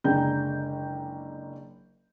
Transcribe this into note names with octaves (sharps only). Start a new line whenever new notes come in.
F#1 D3 G#3 G5 A#5 G6